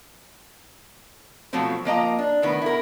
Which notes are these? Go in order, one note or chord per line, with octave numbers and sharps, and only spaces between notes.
B2 F3 F#3 A3 C4
F3 A#3 D#5 A#5
D4
A2 D#3 B3
E4 A#4